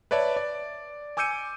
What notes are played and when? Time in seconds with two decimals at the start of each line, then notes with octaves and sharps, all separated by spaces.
0.11 B4 C#5 D5 E5 A5
0.36 D5
1.17 G#5 D6 E6 G6 C#7 D#7